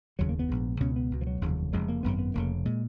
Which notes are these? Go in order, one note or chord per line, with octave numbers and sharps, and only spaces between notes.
F1 D#2 C#3 F#3
A#3
B3
A#1 G#2
C#2 B2 C#4
B3
C#2 B2
F3
F#3
F1 D#2 C#3
F1 F2 C#3 G#3
A#3
G#1 F#2 C#3 B3
B3
F1 F2 C#3 A#3
A#2 G#3